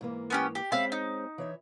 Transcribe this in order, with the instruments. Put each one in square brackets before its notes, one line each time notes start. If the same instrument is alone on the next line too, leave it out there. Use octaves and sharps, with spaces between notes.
[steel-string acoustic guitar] G#2 E3 A#3
[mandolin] B3 C#4 G4
G4
[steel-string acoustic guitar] G#3 C4 C#4 [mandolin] E5 F5 B5
[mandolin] D#4
[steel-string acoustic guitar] E3 C#5 E5